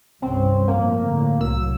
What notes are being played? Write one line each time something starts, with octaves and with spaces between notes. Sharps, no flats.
C2 G2 C4 C#4
F2 A2 F3 A#3
F2 A2 D3
C2 F#3 E6